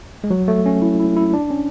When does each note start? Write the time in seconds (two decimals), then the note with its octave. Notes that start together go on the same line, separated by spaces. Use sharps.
0.24 G#3
0.30 F#3
0.48 A3
0.66 C#4
0.82 E4
1.00 E4
1.17 E4
1.33 D4
1.51 C#4